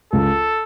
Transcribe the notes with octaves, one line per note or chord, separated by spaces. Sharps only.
C#2 A4